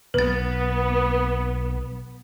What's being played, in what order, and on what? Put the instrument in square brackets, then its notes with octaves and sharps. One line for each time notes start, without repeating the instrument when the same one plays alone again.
[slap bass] B1 [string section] B3 [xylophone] B4 A6